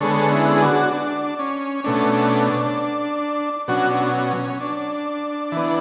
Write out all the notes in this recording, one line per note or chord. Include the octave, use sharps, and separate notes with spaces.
D3 G#3 B3 A4 C#5
C#4 E4
G#4
D4 F#4
D4
C#4
B2 A3 C#4 D4
B2 F#3 C#4 D4 F#4
D4
C#4
C#4
D4
E3 B3